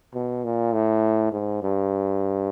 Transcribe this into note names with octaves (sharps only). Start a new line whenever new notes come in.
B2
A#2
A2
G#2
G2